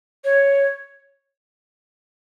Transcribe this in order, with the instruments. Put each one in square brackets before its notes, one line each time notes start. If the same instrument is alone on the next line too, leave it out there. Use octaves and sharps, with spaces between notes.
[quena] C#5